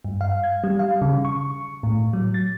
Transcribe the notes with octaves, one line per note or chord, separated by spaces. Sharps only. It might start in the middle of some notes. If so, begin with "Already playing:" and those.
G2
F5
G#6
G3
F5
C#3
C#6
A2
F#3
A6